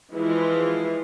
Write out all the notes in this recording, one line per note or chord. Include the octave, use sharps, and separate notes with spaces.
E3 F3 G#3 E4 F4